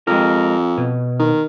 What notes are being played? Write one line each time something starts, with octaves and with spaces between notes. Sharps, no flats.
F2 G#3 G4 A#4
B2
D#3